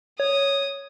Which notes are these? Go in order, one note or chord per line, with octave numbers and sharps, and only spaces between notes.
C#5 D#6